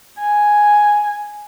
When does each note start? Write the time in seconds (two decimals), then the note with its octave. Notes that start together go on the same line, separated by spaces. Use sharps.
0.19 G#5